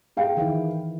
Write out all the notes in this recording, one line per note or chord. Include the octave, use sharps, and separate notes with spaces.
G#4 F5 G5
D#3 E3 E4